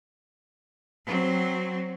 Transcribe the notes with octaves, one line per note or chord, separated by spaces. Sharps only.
F#3 C4